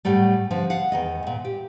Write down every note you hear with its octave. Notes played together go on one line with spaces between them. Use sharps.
A2 F#3 G3 A3
D3 F3
F5 F#5
E2 D#3 D#5
D2 A#2
G4